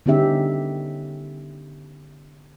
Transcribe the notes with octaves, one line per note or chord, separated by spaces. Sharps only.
D3 B3 C#4 D#4 G4 E5